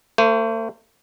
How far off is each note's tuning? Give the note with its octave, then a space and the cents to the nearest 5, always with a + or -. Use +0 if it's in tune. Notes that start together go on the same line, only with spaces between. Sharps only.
A3 +40 C5 -5